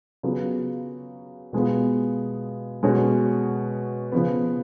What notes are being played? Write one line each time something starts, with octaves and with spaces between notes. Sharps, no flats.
C#3 F#3 B3 F4
B2 G#3 B3 F4
B2 G#3 C#4 F#4
C#3 F3 B3